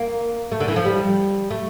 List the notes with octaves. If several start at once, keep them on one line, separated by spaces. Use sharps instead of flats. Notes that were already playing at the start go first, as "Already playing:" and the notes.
Already playing: A#3
A3
D3
E3
F3
G3
A3